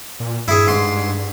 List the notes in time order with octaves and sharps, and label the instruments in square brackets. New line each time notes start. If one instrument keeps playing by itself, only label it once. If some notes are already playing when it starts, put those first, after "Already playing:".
[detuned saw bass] A#2
[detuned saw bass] G2 [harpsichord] E4 G#4
[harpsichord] G#2 C6